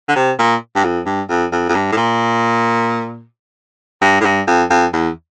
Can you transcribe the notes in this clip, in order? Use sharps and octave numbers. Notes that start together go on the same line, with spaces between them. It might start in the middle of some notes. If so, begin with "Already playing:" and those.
D3
C3
A#2
G2
F2
G2
F2
F2
F2
G2
A2
A#2
G2
A2
G2
F2
F2
E2